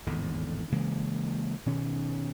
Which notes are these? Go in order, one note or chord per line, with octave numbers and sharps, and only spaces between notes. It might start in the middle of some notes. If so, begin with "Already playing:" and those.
G#1 E2 A2 D3
C#3 E3 G#3 A#3
B2 D#3 C#4